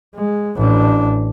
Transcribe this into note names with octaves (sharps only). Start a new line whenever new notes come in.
G#3
A1 D4